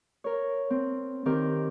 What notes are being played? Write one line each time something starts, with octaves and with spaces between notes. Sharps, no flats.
A#4 C#5
C4
D#3 C4 G4 A#4 D6 G6